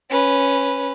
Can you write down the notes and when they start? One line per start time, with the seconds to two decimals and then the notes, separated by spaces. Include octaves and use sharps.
0.10 C#4 B4